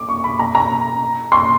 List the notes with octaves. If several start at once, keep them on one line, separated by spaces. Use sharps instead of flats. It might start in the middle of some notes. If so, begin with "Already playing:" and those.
Already playing: D6
C#6
B5
A#5
A#5
C6